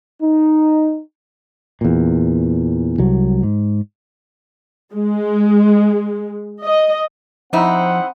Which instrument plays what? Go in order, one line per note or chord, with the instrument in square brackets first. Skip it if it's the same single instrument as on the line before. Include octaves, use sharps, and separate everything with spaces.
[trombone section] D#4
[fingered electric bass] E2 A#2
C2 F#3
G#2
[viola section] G#3
D#5
[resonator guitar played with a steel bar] F2 D#4 E4 [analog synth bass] F3 [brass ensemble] C4 C5 F#5